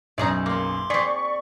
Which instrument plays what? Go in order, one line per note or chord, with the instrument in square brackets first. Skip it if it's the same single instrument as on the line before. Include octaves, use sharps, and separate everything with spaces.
[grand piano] B1 F#2 A#5 [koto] D#4 G#4 D5
[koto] A#3 [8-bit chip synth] C6 D6
[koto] C4 G#4 [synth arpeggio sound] D5 C#6 [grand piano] B6